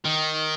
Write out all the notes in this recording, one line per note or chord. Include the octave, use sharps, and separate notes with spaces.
D#3